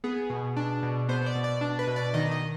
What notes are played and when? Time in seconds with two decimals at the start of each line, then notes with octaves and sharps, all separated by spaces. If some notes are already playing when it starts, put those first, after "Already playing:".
0.04 B3 G#4
0.30 B2
0.57 D4
0.83 B2
1.09 B3 C5
1.26 D5
1.35 B2
1.44 D5
1.61 D4
1.79 B4
1.87 B2
1.96 D5
2.14 D#3 D#5
2.31 D#5